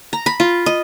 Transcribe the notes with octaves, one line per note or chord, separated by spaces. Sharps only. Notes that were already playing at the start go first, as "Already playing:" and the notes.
A#5
B5
F4
D#5